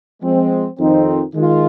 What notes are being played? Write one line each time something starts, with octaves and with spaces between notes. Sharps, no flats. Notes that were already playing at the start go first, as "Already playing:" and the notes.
F3 G#3 C4
F2 D#3 C4 D#4
D#3 G#3 F4